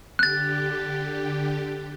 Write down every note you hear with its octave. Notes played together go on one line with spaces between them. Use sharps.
D3 G4 F#6 A6